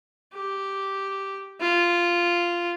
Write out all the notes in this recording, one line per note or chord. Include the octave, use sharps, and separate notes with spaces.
G4
F4